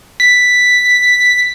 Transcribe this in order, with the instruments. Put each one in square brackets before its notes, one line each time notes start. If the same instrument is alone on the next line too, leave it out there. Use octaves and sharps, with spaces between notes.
[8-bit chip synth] B6